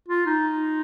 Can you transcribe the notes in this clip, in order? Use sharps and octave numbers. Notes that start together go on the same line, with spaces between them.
F4
D#4